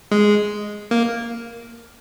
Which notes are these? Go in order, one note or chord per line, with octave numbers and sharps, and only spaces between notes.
G#3
A#3